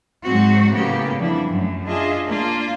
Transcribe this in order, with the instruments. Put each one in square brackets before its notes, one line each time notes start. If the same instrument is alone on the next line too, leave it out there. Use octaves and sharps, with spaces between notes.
[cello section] G#2 F#3 G#3 C4 F#4
A2 C#3 F#3 A#3 B3 G4
F2 E3 G3 D4 E4
F#2 A3
D4 F4 G#4 D#5 E5
A#3 D4 F4